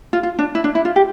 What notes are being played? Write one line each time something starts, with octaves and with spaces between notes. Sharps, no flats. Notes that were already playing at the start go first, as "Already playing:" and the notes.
F4
F4
D4
E4
D4
E4
F4
G4